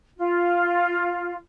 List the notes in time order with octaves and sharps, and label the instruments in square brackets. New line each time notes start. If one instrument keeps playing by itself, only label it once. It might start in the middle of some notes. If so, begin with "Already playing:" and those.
[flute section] F4